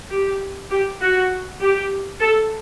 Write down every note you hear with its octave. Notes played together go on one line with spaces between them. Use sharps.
G4
G4
F#4
G4
A4